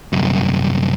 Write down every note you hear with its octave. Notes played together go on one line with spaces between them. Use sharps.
C2 F#2